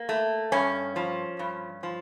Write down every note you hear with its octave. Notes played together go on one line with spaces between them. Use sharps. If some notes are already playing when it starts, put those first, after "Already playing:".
Already playing: A#3
A3
G2 C#4
F3
G2
F3